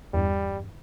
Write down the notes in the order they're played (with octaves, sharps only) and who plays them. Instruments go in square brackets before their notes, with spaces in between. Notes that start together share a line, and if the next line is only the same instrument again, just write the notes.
[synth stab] E2 G2 [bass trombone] G3